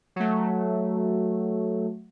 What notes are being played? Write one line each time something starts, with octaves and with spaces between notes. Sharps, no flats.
F#3 A3